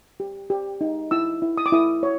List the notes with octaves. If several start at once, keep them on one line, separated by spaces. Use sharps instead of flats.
G4
G4
D#4
E4 E6
E4
D#6
D6
E4 D#6
C#5